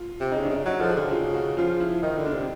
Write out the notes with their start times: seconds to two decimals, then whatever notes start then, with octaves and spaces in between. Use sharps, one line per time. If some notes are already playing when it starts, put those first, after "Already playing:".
Already playing: F4
0.20 C3
0.32 C#3 D#4
0.44 D4
0.50 C#3 D#4
0.65 F#3 D#4
0.81 F3 A4
0.89 G#4
0.96 D3 G4
1.04 F#4
1.11 C#3 F4
1.34 F#4
1.57 F3 F4
1.80 E4
2.02 D#3 D#4
2.17 D3
2.25 D4
2.33 C3